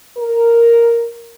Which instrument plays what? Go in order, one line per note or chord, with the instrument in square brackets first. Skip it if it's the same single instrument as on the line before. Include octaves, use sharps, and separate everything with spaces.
[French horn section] A#4